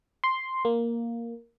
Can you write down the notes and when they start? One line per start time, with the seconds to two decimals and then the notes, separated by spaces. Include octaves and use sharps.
0.24 C6
0.65 A#3